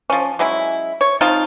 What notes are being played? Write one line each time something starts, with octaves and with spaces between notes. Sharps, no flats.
F3 C#4
F#3 G#3 C#4 E4
C#5
F3 C4 D#4 F4